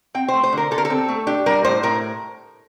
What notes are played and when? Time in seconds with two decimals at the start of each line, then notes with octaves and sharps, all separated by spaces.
0.14 C4 G5
0.28 C5
0.34 A3
0.44 C5
0.53 D3 A#4
0.71 D3 A4
0.78 A#4
0.85 A4
0.90 C4
1.08 A3
1.27 D4 G4
1.46 G3 A#4
1.64 A2 C5
1.83 A2 A#4